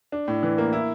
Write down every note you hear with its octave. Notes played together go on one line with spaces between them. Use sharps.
D4
A2
E3
A#3
E4